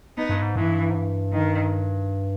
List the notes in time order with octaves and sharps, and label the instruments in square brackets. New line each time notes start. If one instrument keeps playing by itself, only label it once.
[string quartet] B3 D#4
[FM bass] G2
G#2
[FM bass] G2 [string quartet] E3
[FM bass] G#2
G2
[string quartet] D#3